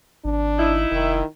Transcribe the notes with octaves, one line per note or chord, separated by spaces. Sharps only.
G#1 D4
D#4 E4
F1 D#3